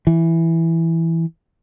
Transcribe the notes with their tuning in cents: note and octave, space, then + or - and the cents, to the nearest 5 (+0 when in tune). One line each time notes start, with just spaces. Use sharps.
E3 +0